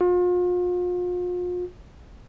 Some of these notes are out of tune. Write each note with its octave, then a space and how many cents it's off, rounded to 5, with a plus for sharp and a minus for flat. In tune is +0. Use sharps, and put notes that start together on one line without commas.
F4 +40